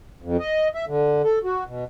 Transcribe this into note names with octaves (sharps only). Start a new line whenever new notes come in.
F2
D#5
E5
D3
A4
F#4
B2